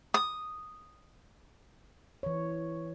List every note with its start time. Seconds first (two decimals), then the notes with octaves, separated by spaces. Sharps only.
0.14 D#6
2.23 E3 C#5